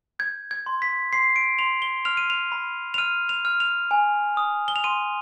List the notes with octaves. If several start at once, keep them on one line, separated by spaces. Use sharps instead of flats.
G6 G#6
G#6
C6
B6
C6 C7
D7
C6 F7
G7
F6 F7
D#7
F7
B5
F7
F6 D#7
F7
F6
F7
G#5
D#6
G7
F7
C6 D#7